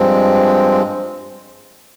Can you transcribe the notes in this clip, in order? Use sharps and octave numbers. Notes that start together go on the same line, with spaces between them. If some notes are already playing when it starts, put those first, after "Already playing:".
Already playing: G2 F3 G#3 C4